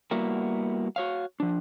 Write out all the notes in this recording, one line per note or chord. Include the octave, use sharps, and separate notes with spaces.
G3 A#3 B3 E4 F#4 A#4
F#4 C#5 F5
F3 D4